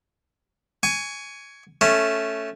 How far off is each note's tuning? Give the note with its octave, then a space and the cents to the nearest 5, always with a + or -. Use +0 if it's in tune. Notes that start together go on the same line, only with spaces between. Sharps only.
G#5 +0 C#6 +25
A3 +0 C#4 +0 A5 -10